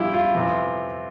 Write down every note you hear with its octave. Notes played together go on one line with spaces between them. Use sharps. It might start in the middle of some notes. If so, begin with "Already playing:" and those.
Already playing: G2 F3 E4 F4 G4
F4
F2 C3 E3